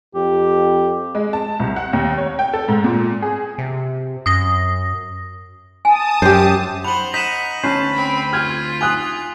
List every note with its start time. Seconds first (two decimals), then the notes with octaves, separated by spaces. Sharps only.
0.15 F2 G4
1.15 G#3
1.33 A5
1.60 C2
1.76 F#5
1.93 D#2
2.18 C#5
2.39 G5
2.54 A4
2.68 G#2
2.84 A#2
3.22 G#4
3.58 C3
4.26 F#2 D#6 A#6
5.85 G#5 A5 D#6
6.22 F#2 G4 C5
6.84 C5 F#5 B5 F7 F#7
7.14 D#4 F#5 B6 D#7 E7
7.63 D2 C#4 B4 C5 A5
7.95 C4 B5
8.33 F4 F6 G6 G#6
8.81 G#5 D#6 F#6 F7